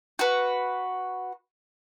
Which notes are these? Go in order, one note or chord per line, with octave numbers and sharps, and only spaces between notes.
F#4 B4